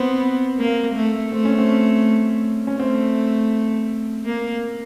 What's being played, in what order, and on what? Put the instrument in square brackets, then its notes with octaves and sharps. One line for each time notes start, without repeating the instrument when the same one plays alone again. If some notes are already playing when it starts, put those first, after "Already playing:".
Already playing: [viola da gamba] B3 [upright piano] C4
[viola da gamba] A#3
A3
[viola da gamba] A3 [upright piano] C4
[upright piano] C#4
C4
C#4
[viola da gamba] A3 [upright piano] C4
[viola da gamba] A#3